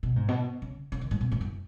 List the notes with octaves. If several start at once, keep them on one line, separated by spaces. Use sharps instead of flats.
B2
G#2
B2
C#3
C#3
D#3
G#2
B2
G#2
F#2